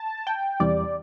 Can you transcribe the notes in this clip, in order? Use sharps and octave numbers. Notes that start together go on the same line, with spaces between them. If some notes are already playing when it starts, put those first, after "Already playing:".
Already playing: A5
G5
E2 C3 E3 G3 D5